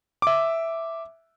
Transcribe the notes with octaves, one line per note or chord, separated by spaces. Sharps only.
E5 D6